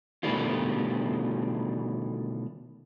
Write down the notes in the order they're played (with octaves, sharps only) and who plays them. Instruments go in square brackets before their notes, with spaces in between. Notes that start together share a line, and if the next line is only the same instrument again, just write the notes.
[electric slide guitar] B2 D3 D#3 G3 A3 F4